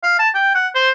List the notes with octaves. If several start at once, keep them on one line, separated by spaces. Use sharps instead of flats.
F5
A5
G5
F#5
C5